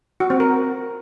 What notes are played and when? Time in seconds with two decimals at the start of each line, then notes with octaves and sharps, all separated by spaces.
0.20 F#4
0.30 C4
0.40 A#4